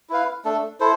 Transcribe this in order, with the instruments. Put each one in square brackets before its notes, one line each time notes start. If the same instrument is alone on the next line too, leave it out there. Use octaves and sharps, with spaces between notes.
[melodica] E4 B4 F5
A3 D4 A4
E4 A4 C5